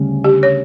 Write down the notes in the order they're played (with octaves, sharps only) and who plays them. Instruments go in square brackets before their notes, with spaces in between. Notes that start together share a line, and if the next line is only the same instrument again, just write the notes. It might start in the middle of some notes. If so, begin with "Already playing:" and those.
Already playing: [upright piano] D2 C#3 G3 C#4
[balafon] G4
C#5